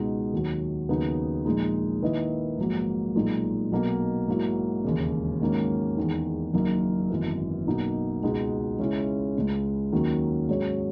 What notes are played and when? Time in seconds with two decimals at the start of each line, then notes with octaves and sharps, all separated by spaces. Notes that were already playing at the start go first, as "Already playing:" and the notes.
Already playing: C#2 B2 G#3 D#4
0.33 D#2 D#3 F#3
0.89 D#2 C#3 F#3 B3 D#4
1.45 A#1 A#2 G#3 D#4
2.02 D#3 A#3 E4 B4 D#5
2.58 A#1 G#2 F#3 A#3
3.15 B1 A#2 G#3 D#4
3.72 B1 B2 A#3
4.27 G#2 F#3 A#3 E4
4.84 E1 D#2 C#3
5.41 G#2 D#3 F#3 A#3 C#4
5.97 E2 D#3 G#3 D#4
6.53 F#1 F#2 D#3 A#3
7.10 G#1 F#2 E3 B3
7.66 B1 B2 A#3 D#4
8.23 C#2 B2 G#3 D#4
8.79 C#2 C#3 G#3 C#4 E4
9.36 C#2 C#3 G#3
9.92 D#2 D#3 F#3 A#3 C#4
10.48 G#2 F#3 C#4 G#4 C#5